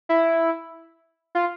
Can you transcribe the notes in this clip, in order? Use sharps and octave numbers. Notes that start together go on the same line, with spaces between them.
E4
F4